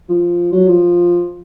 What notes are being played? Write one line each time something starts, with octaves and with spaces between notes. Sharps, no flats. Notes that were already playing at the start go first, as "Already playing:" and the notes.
F3
F#3
F3